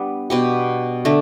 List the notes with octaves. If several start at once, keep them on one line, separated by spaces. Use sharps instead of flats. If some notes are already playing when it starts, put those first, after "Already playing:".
Already playing: G3 B3 D4
B2 B3 G4
D3 A3 D4